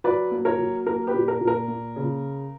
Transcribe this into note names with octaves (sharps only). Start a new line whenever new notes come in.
F#3 B4 D5
A#3
A#4 C#5
F#3
A#3 A#4
G4 B4
A#2
A#4
A#2
A#4
A#3
C#3